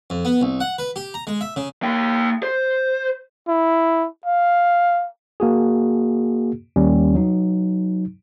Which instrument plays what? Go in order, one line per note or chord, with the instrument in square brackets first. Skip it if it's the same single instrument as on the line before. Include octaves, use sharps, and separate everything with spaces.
[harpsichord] F2
B3
C2
F#5
B4
G4
A#5
G#3
E5
C#3
[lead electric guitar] A#3 G5
C5
[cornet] E4
F5
[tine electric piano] A#3 F#4 G#4
D#2 G3 C#4
F#3 D#4